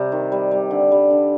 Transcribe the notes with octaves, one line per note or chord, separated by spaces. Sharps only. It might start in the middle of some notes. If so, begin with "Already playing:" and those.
Already playing: C3 G3 D#5
D#3
G3
G3
D3
G3
D3